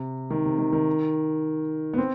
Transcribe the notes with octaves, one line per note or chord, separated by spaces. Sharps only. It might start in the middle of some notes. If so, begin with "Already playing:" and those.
Already playing: C3
D#3
C3
D#3
D#3
B3
C4